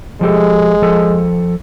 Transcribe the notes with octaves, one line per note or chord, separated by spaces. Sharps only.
F3 G#3 G4 A4
F3 A4